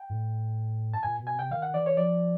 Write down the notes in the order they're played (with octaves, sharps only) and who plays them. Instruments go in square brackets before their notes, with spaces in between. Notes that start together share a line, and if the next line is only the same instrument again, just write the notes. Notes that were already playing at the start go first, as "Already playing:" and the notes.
Already playing: [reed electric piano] G5
[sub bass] A2
[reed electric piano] A5
[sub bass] A#2 [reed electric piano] G#5
[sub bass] B2
[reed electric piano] G#5
[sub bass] C3 [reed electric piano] G5
[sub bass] D#3 [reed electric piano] F5
[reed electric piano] F#5
[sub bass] E3 [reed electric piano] D5
[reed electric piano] C#5
[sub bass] F3 [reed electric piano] D5